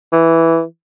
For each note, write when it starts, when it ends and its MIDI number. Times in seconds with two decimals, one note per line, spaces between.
0.12 0.63 52